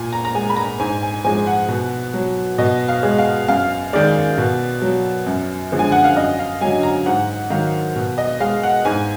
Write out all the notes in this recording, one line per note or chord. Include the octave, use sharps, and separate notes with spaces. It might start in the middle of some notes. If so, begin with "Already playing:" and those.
Already playing: A#2 G#5
A#5
A#5
G#3 G#5
B5
A#5
G#2 G#5
G#5
F3 G#3 G#5
F#5
B2
F#3
B2 D#5
F5
G#3
F5
F#2 F5
D#3 G#3 D5
B2
F#3
F#2
D3 F3 G#3
G#5
F#5
F5
F#2 D#5
F5
D3 F#3 G#5
A#5
G#2 F#5
D#3 F#3 F5
B2
D#5
G#3 F5
F#5
G#2 G#5